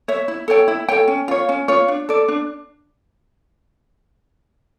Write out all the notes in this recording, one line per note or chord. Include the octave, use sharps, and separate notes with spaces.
C#5 E5
E4
A4 C#5 G5
E4
A4 C#5 G5
C#4
F4 C#5
C#4
F4 C#5
D4
A4 D5
D4